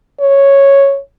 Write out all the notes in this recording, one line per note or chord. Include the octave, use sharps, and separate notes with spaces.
C#5